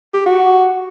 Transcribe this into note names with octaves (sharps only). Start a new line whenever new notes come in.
G4
F#4